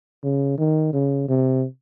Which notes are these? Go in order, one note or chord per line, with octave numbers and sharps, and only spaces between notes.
C#3
D#3
C#3
C3